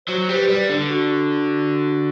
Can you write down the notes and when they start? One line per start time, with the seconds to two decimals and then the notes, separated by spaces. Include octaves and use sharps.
0.08 F#3 C5
0.29 G3 C5
0.36 B4
0.48 G3
0.69 D3
0.90 F#4